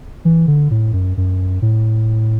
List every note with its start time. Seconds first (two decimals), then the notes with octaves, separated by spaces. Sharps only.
0.25 E3
0.47 D3
0.71 A2
0.93 F#2
1.17 F#2
1.62 A2